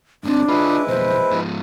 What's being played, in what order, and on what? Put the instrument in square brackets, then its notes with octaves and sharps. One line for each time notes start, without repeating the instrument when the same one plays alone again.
[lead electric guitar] G#2 C4 [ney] D4
[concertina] G#3 E4 B4 [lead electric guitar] F4 C#5
[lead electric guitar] B1 F2 [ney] C5
[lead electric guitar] G#2 F3